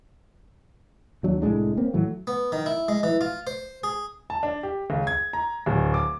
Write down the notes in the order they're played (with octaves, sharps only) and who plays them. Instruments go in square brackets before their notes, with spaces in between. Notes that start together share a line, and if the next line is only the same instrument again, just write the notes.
[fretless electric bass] D#2 F#3 D4
C2 A2 G#3 D4
A#3 C4 C#4
A2 E3 F#3 A3
[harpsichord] B3
D#3
E4
G#3
E3
F4
C5
G#4
[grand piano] A5
D4
G4
C#2
G#6
A#5
D1
D6